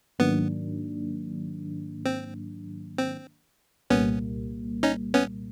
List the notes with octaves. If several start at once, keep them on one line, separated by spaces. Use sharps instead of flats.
G#2 D#3 F#3 A#3 B3 D4
C4
C4
C2 A#2 G3 A#3 B3 C#4
C#4 D#4
B3 C#4